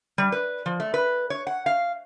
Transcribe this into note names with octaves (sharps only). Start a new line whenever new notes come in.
G3
B4
F3
A3
B4
C#5
F#5
F5